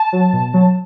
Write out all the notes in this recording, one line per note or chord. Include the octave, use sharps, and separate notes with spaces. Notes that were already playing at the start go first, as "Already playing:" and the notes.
Already playing: A5
F#3
B2
F#3